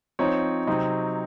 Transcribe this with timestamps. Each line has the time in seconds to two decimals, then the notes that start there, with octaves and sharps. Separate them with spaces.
0.19 F3 C4 D#4 C#5
0.67 C3 F#3 C4 D#4